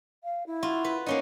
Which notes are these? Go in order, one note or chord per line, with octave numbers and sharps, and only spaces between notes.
F5
E4
F4 F#4
B4
A#3 C#4 D#4 F#5